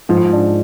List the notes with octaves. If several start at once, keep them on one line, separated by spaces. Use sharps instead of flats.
G#2 F3
A2
G#2
D4